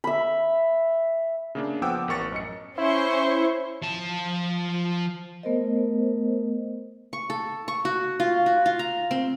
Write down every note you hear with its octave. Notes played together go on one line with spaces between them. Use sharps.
E5 B5
C#3 A#3 D4
F3 B3 F#5 G5 D6 E6
A1 A#4 C#6 A6 C#7
F#2 D#5 C#7
C#4 E4 C5 C#6
F3 A5
A3 B3 A#4 C5 D#5
C#6
A4
C#6
F#4
F4
F#4
F4
A#5
C4